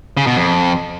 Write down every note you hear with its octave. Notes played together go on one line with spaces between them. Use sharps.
C#3
B2
F2